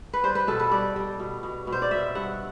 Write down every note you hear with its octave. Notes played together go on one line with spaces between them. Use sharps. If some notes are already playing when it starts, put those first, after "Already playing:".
B4
G3 C5
B4
B2 A4
B4
G3 D5
G3
B2
B2
B2
C5
D5
B2 E5
G2 F#5